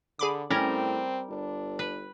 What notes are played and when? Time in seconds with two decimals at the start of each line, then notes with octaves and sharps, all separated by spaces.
0.19 D3 G#4 B5 D6
0.50 A2 G3 C4 C#4 A#4
1.30 G1 D4
1.79 B4